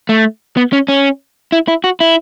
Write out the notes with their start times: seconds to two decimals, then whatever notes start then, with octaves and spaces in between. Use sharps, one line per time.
0.09 A3
0.57 B3
0.73 C#4
0.88 C#4
1.52 E4
1.68 E4
1.84 F#4
2.00 E4